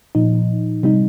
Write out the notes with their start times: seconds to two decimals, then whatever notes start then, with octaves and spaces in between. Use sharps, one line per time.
0.15 A#2 F3 D#4
0.83 C3 G3 D#4